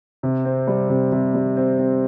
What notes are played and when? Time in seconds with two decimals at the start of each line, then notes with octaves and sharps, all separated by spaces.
0.23 C3
0.45 C4
0.67 G3
0.90 C3
1.12 C3
1.34 G3
1.57 C4
1.79 C4